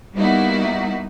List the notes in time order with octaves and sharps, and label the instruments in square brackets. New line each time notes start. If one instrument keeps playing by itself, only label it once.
[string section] G3 A#3 B3 D#4 E4 F#4